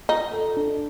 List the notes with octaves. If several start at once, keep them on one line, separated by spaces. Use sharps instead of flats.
D#4 F4
A4
D4